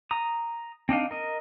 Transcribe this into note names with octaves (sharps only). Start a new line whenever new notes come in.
A#5 D#6
C4 D4 D#4 F5
A#4 D#5